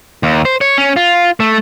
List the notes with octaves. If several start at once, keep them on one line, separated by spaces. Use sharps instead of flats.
D#2
C5
C#5
C#4
F4
A3